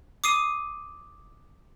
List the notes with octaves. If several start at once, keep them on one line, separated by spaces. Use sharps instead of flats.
D6 D#6 C7 D#7